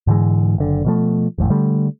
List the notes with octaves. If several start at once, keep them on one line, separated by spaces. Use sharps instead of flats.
G#2 D3 E3 G#3
F#1 D3
B2 F3 A3
G#1 F2 A2
D3 G3 A3